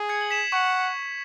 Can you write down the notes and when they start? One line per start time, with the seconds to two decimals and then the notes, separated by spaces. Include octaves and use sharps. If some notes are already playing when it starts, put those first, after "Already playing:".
Already playing: G#4
0.09 G#6 C#7
0.21 F#7
0.30 B6 E7
0.52 F#5 C#6